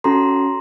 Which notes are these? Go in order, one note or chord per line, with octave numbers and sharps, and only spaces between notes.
C#4 F#4 A4 A#5 C6